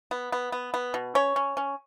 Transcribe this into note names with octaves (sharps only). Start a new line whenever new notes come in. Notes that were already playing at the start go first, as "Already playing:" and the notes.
B3
B3
B3
B3
B2
C#4 C#5
C#4
C#4